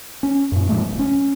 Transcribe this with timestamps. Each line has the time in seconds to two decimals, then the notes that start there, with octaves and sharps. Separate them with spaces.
0.23 C#4
0.52 F#2 A#2
0.69 A#2 F3 G#3 A3
0.85 D1 B1
0.99 C#4